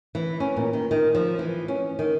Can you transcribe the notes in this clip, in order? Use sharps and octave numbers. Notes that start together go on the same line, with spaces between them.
E3
C#4
A#2
D#3
D#3
F3
E3
C#4
D#3